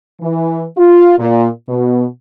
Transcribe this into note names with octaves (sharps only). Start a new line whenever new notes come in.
E3
F4
A#2
B2